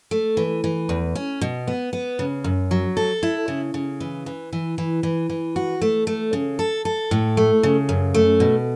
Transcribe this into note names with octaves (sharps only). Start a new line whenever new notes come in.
A3
E3
E3
E2
C#4
B2
B3
B3
C#3
F#2
F#3
A4
E4
C#3
C#3
E3
E3
E3
E3
E3
E3
F#4
A3
A3
C#3
A4
A4
A2
A3
C#3
F#2
A3
B2